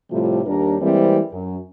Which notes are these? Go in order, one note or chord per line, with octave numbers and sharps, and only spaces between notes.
A2 C3 F3 G3 A3 F4
D#2 G3 D4 A#4
E3 G3 G#3 A#3 C4
F#2